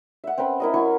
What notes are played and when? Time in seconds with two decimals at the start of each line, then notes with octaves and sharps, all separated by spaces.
0.24 E5 F#5
0.38 C4 C#4 B4 B5
0.60 E4 A#4 D#5
0.74 F#3 E4 G#5 C#6